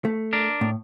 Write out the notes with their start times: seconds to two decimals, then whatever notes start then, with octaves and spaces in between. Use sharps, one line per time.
0.05 A3
0.33 D4 A#4
0.61 A2